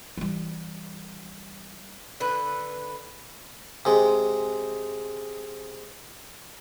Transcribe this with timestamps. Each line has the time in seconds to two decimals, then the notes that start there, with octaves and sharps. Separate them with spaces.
0.17 E3 G3
2.20 D3 B4
3.85 C3 G#3